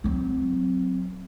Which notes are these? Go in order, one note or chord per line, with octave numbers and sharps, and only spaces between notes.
F#3 C4